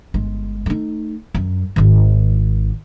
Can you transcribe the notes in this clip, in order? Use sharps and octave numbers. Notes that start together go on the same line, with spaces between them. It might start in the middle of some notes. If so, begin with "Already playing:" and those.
G1 G#3
A3 D#4
F#2
G#1 D#3